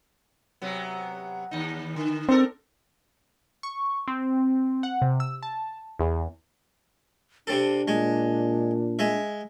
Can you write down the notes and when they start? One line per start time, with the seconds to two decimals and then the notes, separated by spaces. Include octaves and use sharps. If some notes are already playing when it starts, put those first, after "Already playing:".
0.62 C3 F#3 B3
1.51 D#2 D#4
1.96 D3
2.29 C4 D4 A4 A#4
3.63 C#6
4.08 C4
4.83 F#5
5.02 C3
5.20 E6
5.43 A5
5.99 E2
7.47 C3 C4 D4 A4
7.88 A#2 G#3
8.99 G#3 E5